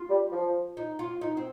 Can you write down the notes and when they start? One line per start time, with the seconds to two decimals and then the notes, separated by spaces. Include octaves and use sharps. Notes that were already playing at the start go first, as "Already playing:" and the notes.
Already playing: F4
0.09 G3
0.31 F3
0.77 D#4
0.99 F4
1.21 D#4
1.37 C4